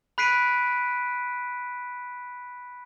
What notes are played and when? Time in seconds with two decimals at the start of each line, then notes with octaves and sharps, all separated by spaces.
0.18 B5 F#6 B6 C7 D7 D#7